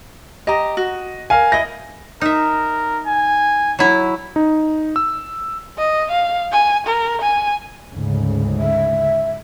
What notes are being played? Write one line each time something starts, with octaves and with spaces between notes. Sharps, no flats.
G4 D#5 A#5
F#4
A#4 F5 G#5
E4 D#5 A#6
D#4 A#4 E5
G#5
F#3 E4
D#4
E6
D#5
F5
G#5
A#4
G#5
D2 G#2 C#3
E5